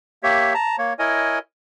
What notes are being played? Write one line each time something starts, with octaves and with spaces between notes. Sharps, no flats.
A#3 G4 C#5 E5
A5 A#5
A#3 C#5
E4 A#4 C#5 D#5 G#5